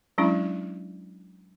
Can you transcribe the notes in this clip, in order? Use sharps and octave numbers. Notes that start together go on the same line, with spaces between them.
F#3 G#3 C#4 D4 E4